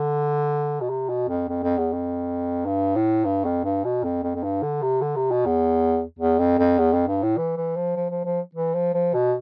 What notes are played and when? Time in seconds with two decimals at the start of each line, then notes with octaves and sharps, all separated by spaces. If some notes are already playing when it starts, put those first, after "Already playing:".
Already playing: D3
0.81 B2
0.90 C3
1.09 B2
1.29 F2
1.48 F2
1.63 F2
1.78 E2
1.92 F2
2.66 G2
2.95 A2
3.25 G2
3.45 F2
3.64 G2
3.84 B2
4.04 F2
4.23 F2
4.35 F2
4.43 G2
4.63 D3
4.82 C3
5.01 D3
5.16 C3
5.31 B2
5.46 E2
6.19 E2
6.39 F2
6.59 F2
6.79 E2
6.93 F2
7.08 G2
7.23 A2
7.37 E3
7.57 E3
7.76 F3
7.96 F3
8.11 F3
8.25 F3
8.55 E3
8.74 F3
8.94 F3
9.14 B2